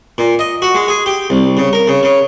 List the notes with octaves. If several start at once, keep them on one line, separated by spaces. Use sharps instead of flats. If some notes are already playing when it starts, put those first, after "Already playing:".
A#2
D#5
F#4
G#3
G#4
G4
C2
C#3
A#4
C#3
C#3